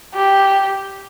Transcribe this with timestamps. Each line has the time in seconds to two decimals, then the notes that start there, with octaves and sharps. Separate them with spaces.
0.15 G4